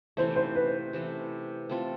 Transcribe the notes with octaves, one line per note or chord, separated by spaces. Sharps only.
C3 E3 A3 C5
C5
B4
C3 E3 A3
A3 C4 F4 A4